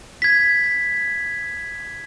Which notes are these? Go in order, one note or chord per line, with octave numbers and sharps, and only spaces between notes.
G#6 B6